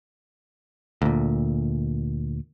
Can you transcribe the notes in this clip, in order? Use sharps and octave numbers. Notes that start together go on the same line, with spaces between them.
D2 A#2